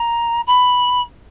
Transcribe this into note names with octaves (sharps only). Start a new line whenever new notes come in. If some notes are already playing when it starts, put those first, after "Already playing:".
Already playing: A#5
B5